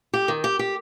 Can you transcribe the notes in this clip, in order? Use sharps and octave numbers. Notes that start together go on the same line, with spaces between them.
G4
D#3
G4
G4